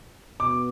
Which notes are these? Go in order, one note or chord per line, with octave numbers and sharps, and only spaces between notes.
B2 B3 D6